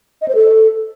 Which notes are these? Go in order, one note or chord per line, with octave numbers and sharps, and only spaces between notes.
D#5
C5
A4